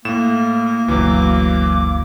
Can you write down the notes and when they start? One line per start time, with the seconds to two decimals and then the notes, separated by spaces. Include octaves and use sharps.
0.05 A2 A#3 E7
0.88 G1 D2 E3 F#3 D6